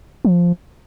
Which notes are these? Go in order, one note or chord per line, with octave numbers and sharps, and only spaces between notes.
F3